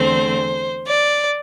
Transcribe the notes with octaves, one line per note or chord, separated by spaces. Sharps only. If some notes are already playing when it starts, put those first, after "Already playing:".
Already playing: E2 D3 A3 C4 C5
D5